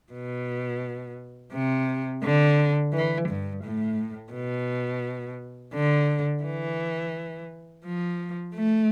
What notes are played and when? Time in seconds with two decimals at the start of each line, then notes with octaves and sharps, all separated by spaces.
0.13 B2
1.53 C3
2.23 D3
2.93 E3
3.29 G2
3.64 A2
4.33 B2
5.74 D3
6.44 E3
7.85 F3
8.54 A3